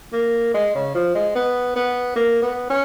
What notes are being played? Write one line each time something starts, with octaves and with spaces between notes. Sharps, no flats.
A#3
G#3
C#3
F3
G#3
B3
B3
A#3
B3
C#4